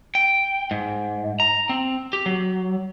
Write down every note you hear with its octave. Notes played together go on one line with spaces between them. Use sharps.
G5
G#2
A#5
C4
G4
F#3